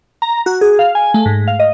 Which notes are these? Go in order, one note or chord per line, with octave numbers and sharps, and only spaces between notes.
A#5
F#4
G#4
F5
G#5
A3
G#2
F5
D#5